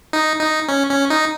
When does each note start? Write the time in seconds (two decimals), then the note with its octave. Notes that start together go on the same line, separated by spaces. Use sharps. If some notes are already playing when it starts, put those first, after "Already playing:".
0.13 D#4
0.40 D#4
0.69 C#4
0.90 C#4
1.10 D#4